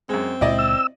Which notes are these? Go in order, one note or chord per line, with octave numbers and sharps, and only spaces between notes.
F#2 G#3 C4
C#2 A#2 G#3 E4 D5 D#5
E6